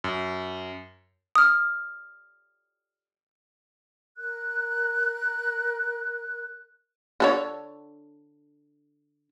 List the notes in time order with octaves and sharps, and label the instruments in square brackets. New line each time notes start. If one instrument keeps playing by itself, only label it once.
[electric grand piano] F#2
[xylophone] D#6 F6
[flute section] A#4 F#6
[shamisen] D3 A4 C#5